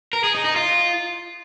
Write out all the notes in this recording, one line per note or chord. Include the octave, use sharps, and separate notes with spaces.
A#4
G#4
D#4
D#4
F4